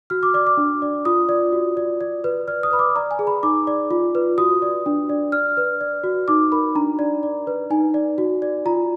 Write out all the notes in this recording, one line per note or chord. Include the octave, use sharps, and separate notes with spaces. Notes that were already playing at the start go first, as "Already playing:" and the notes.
F#4 F6
D6
D5 D6
D6
D4
D5
F4 D#6
D5
F#4
D5
D5
B4
D5 F6
D#6
B4 B5
D6
D5 A#5
G#5
G#4
B5
D#4 D6
D5
F4
B4
F#4 D#6
D5
D4
D5
D5 F6
B4
D5
F#4
D#4 D6
A#4 B5
D4 A#5
D5
D5
B4
D#4 G#5
D5
F#4
D5
F4 A#5